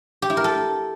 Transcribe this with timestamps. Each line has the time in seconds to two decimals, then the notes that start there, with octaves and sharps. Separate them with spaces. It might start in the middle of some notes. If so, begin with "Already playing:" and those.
0.22 G4
0.30 E4
0.37 A#4
0.44 A4